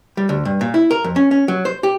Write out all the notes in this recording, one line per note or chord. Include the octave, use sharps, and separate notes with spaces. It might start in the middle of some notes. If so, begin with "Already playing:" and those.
G3
D2
G2
A#2
E4
A#4
F2
C#4
C#4
F#3
C5
G4